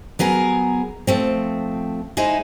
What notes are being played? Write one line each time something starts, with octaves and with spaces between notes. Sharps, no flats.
F#3 B3 G#4 A#4
F3 A3 C4
G#3 D#4 E4 C5